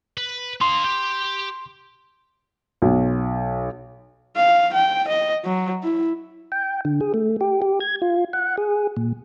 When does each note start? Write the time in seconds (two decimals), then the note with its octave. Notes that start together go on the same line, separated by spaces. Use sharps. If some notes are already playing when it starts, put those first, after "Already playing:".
0.18 B4
0.61 D#4 F5 C6
0.84 G4
2.82 B1
4.36 F5
4.73 G5
5.08 D#5
5.45 F#3
5.83 E4
6.52 G5
6.85 D3
7.01 G#4
7.14 A3
7.41 G4
7.62 G4
7.80 G#6
8.02 F4
8.33 F#5
8.57 G#4
8.97 A#2